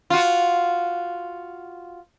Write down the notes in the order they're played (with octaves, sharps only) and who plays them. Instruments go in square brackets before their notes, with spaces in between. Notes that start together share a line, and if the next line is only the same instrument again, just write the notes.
[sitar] F4 F#4